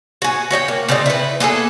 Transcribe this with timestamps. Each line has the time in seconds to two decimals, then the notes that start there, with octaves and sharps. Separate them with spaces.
0.22 F#4 G#4
0.51 F#4 C#5 D#5 G5
0.68 A#3
0.88 C#3 C4 D5 D#5
1.06 E4 B4
1.40 A#3 B3 G#4 A4